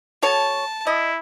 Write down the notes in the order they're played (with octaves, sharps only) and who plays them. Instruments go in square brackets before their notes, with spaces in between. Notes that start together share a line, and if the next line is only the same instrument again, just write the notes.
[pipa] F#4 A4 C#5 [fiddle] A5
[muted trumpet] E4 [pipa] D#5